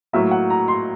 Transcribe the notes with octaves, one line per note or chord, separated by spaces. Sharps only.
A2 F#3 A#3 E5
F#5
A#5
C6